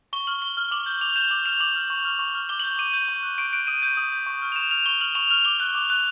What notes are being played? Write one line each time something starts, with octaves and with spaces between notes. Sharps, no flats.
C#6 G7
F6 F#7
C#6 G7
F6
D6 F#7
G6 F#7
D6 F7
G6 E7
D6 F#7
F6 F7
D6 F#7
F6
C#6
F6
C#6
F6
D6 G7
F#7
G6
D6 D#7
G6
C#6
F#6
C#6 D7
F#6 D7
D#6 D#7
G6
D#6
G6
C#6
F6
F7
C#6 E7
F6 F7
C#6 G7
F6 F#7
C#6 F7
F6 F7
D6 G7
F#6
D6
F#6